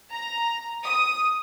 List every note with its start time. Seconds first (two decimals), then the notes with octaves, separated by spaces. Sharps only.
0.12 A#5
0.85 D#6